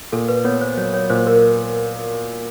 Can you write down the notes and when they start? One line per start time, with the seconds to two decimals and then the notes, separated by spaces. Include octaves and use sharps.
0.12 A#2 A4
0.28 B4
0.45 B3 C#5
0.61 C5
0.77 F#3 C#5
0.94 C#5
1.10 A#2 C5
1.27 A#4